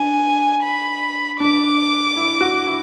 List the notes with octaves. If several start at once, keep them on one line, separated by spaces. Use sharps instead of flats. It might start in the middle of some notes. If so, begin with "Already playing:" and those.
Already playing: D4 G#5
B5
D4 D6
E4
F#4
E4